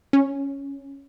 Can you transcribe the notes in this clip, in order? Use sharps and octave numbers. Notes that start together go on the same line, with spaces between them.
C#4